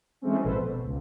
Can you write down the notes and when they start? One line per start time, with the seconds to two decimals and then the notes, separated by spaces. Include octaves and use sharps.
0.21 E3 F#3 G#3 A3 C4 C#4
0.44 G#1 B2 F3 A4 B4 C5
0.56 B2
0.83 C#2